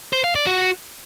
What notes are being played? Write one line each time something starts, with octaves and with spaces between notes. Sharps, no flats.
C5
F5
D5
F#4